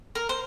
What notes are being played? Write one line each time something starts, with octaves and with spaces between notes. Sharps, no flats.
A#4
C5